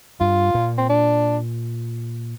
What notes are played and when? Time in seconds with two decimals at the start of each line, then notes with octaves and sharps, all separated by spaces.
0.20 G2 F4
0.55 A#2
0.78 C4
0.89 D4